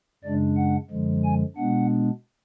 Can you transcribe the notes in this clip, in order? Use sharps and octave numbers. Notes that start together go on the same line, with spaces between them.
F#2 C#3 G#3 D4 D5
F#5
F#2 D3 F3 G#3
G#5
B2 G#3 B3 D4 F#5